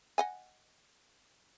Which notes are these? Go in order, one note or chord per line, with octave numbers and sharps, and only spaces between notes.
D#5 F#5 G#5